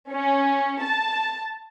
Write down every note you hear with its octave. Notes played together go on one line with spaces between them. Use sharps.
C#4
A5